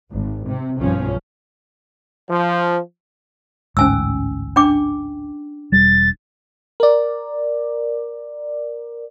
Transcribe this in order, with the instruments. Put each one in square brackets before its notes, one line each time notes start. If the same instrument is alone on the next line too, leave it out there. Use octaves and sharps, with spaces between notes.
[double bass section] G#1
C3
B1 G2 F3 C#4
[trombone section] F3
[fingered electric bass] A1 D2 G#2 [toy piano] C#4 G#5 E6
[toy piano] D4 G5 D6
[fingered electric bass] E1 G3 [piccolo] A6
[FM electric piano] A#4 D5